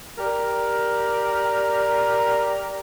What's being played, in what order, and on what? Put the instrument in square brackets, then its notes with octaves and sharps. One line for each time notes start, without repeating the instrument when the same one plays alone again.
[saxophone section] G4 A#4 D5